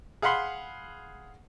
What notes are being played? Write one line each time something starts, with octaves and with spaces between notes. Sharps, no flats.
G#4 F5 F#5 B5 C6